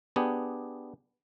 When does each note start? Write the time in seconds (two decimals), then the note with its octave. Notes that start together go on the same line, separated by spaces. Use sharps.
0.16 B3 D4 G4 G#4